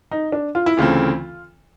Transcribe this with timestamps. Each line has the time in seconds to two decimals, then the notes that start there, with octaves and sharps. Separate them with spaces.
0.11 D#4
0.32 D4
0.55 F4
0.66 E4
0.77 D2 C#3 E3 A3 C4 F4